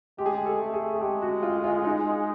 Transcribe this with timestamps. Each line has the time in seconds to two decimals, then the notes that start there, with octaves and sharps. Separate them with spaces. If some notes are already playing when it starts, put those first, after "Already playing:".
0.18 G#3 G4
0.26 G#4
0.34 G4
0.46 A4
0.59 A3
0.74 G#4
0.94 G#4
1.01 G#3 G4
1.22 F#4
1.43 F4
1.64 F4
1.85 D#4